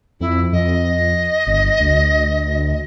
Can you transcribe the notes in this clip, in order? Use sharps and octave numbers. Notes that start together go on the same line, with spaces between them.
F2 E4
F2 D#5
G1
D2